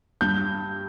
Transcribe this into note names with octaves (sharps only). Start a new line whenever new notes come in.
G2 G6